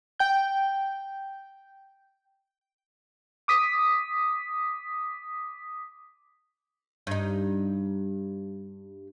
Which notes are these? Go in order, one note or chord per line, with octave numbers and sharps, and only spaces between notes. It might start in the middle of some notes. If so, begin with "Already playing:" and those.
G5 G6
D6 D#6 B6
G2 D#4